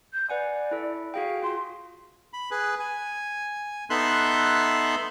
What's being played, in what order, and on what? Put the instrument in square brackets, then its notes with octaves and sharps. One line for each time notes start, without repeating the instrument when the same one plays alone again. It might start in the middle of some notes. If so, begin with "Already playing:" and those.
[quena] G6
[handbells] B4 F#5 G#5 [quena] D5
[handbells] E4 A4
[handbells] F#4 G#4 G5 [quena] F5
[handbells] F4 G#4 [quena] C6
[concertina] B5
G#4 B4
G#5
B3 D#4 A4 E5 C6 F#6